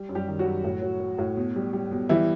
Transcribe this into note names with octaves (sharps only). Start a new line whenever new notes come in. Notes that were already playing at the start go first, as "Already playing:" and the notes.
Already playing: G3
F#2
G3 G4
D#3
F#3 F#4
F#2
A2
F#3
F#3
A2
B2
G3
G3
B2
E3 G3 E4